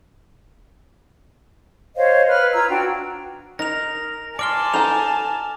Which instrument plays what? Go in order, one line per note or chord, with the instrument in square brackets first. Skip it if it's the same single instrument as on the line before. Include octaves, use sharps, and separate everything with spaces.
[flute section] C5 C#5 D#5 F5
B4 F6
F4 A#5 E6 G#6
D4 F#4 G5
[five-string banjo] D#4 [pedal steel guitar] A#4 [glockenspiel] A#6 F7
[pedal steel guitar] D5 C6 [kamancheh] G#5 A5 [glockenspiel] D6 F6 G7
[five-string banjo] D#4 A4 A#5 [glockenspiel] F7